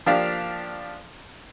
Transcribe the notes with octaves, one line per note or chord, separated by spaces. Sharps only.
F3 A#3 D4 G4 F5